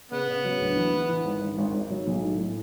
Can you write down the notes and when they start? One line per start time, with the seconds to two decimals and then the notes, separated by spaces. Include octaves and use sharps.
0.11 C#3 B3
0.28 C#3
0.45 F#3
0.61 D2
0.76 E3
0.93 E3
1.09 E3
1.25 G#1
1.42 G#1
1.58 G#1
1.74 G#1
1.90 F#3
2.07 B1
2.22 A2
2.38 A2